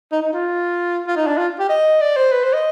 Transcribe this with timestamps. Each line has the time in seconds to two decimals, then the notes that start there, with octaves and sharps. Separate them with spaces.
0.12 D#4
0.22 D#4
0.33 F4
1.07 F4
1.16 D#4
1.27 D4
1.38 F4
1.59 G4
1.69 D#5
2.01 D5
2.16 C5
2.32 B4
2.44 C5
2.53 D#5